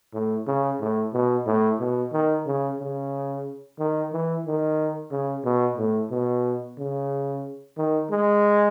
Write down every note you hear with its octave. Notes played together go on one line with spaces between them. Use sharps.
A2
C#3
A2
B2
A2
B2
D#3
C#3
C#3
D#3
E3
D#3
C#3
B2
A2
B2
C#3
D#3
G#3